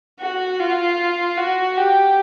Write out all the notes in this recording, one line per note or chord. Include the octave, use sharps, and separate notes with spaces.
F#4
F4
F#4
G4